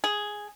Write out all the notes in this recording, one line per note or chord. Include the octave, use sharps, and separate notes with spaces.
G#4